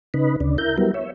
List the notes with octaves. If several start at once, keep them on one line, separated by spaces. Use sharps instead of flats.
C#3 D#4 B4
D2 C#3 D4
E4 A#4 G6
F#3 G3 B3 E4 A#4
C#5 E5